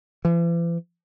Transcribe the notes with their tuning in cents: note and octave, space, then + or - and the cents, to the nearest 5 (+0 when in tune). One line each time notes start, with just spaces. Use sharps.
E3 +45